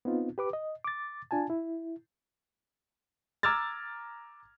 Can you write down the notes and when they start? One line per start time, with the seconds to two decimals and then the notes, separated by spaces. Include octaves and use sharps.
0.05 B3 C4 D#4 F4
0.38 G4 B4 D6
0.53 D#5
0.84 D6 A6
1.31 D4 F4 G#5 A5
1.50 E4
3.43 A#5 D6 E6 F6 G#6 A6